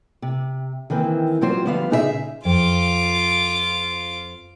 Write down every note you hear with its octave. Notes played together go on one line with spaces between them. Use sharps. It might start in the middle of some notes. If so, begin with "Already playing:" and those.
C3
D#3 E3 A#3 C4
F#3 G3 C4 F4 C5
D3 F3 G3 B3 B4 F5
A#2 C#3 D#4 G#4 B4 E5
F2 F4 D6